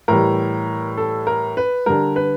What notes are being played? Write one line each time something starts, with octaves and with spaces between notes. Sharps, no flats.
A2 E3 G3 A#4
A4
A#4
B4
D3 G3 A#4
B4